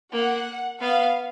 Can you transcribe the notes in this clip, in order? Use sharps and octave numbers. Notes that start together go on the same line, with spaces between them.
A#3 F#5
B3 F5